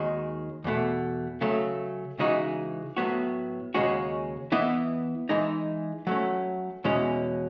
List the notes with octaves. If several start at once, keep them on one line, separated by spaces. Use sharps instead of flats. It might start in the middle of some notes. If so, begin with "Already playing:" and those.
Already playing: D#2 D#3 G#3 D#4 F#4
E2 B2 A3
C#3 F#3 A3
C#3 E3 G#3 D#4 F#4
A2 F#3 B3 F#4
D#2 C#3 G#3 C#4 F#4
E3 B3 E4 B4 D#5
E3 G#3 D#4
F#3 A3 C#4
E2 B2 G#3 C#4 E4